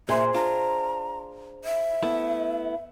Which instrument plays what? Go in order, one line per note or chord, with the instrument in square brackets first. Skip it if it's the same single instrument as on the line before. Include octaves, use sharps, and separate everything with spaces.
[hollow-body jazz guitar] A#2 [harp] G#4 C5 C6 [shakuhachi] E5
[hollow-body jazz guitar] D4 F4 [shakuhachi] A#5
[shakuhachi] E5
[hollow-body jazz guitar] A3 B3 E4